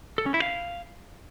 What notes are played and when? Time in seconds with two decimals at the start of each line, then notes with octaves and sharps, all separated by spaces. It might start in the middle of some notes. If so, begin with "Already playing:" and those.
0.18 A4
0.26 C#4
0.34 E4
0.42 F5